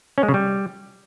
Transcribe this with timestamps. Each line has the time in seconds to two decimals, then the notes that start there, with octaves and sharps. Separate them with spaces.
0.18 C#4
0.23 G#3
0.29 C#3
0.34 G3